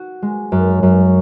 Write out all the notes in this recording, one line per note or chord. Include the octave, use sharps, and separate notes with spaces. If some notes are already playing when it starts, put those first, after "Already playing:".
Already playing: F#4
G#3
F#2
F#2